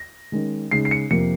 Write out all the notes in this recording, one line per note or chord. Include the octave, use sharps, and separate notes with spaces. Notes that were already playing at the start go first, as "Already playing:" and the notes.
Already playing: A#6
D#3 G#3 C#4
C#3 G#3 D#4 C7
C7
C#7
F2 C3 F3 A#3 C#7